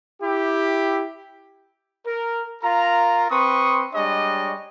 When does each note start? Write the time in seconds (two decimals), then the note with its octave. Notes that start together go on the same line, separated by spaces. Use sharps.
0.21 E4 G4
2.06 A#4
2.63 F4 A#4 A#5
3.30 C4 B4 C6 C#6 D#6
3.94 G3 G#3 D4 C#5 D#5